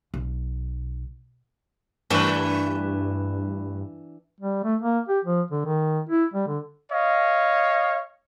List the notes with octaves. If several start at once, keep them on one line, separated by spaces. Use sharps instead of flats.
B1
G2 E3 A3 D4 B4
G3
A3
A#3
G4
F3
D3
D#3
E4
G3
D3
C#5 D#5 F5